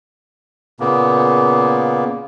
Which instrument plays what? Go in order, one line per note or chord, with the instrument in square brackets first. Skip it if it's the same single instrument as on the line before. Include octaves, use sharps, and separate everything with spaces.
[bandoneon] A#2 C#3 A#3 B3